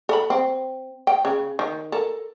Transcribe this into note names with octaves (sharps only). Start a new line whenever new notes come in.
A4 B5
C4
G5
C#3
D#3
A4 A#4